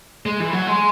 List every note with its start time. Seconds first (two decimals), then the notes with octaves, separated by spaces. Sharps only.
0.26 G#3
0.40 E3
0.53 F#3
0.67 G#3